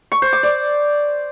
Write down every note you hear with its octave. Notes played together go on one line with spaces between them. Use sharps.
C#6
C5
D6
D5